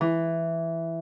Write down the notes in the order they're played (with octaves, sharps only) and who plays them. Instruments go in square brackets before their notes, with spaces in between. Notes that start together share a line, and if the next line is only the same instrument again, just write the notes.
[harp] E3